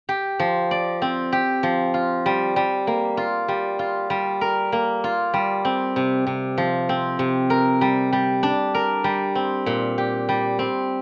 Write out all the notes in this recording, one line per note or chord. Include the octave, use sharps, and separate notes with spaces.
G4
F3
D5
C4
G4
F3
F4
G3
G3
A#3
F4
G3
F4
G3
A#4
A#3
F4
G3
C4
C3
C3
F3
C4
C3
A#4
G3
G3
D4
A#4
G3
C4
A#2
G4
G3
C4